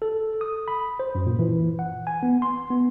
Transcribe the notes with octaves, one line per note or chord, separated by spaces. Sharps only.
A4
D#6
B5
C5
F#2
A#2
E3
F#5
G#5
B3
C6
B3